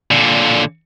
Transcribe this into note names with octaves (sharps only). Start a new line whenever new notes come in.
A#2 D3